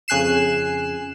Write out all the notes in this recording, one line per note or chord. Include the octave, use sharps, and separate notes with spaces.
F2 C#3 G#5 F#6 C7 E7